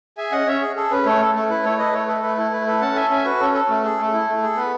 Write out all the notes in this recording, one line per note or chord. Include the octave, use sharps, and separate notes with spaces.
G#4 E5 G#5
C#4 D#5 F#5
C#4 C#5 E5
G#4
G#4 A4
C#4 B4
A3 A4 C#5
A4
A3 A4
E4 B4
A3 A4 C#5
A4 B4 D#5
A3 A4 C#5
A4 B4
A3 B4
E4 A4
A3 B4
A4 B4
C#4 F#5 A5
A4 E5 G#5
C#4 E5 G#5
F#4 B4
C#4 A4
A4
A3
G#4
A3
E4
A3
G#4
B3 B4